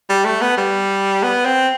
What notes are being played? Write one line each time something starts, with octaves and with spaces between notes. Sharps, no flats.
G3
A3
B3
G3
B3
C4